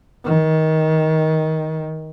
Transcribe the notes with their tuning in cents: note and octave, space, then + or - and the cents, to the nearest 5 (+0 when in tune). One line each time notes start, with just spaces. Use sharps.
D#3 +20